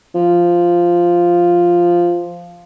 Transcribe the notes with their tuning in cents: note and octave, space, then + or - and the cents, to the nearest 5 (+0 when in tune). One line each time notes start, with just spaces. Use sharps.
F3 -5